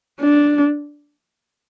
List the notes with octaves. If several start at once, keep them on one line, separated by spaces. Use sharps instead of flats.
D4